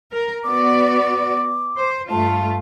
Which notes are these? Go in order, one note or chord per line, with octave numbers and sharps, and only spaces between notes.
A#4
B3 F#4 D5 D6
C5
G2 A3 F4 A5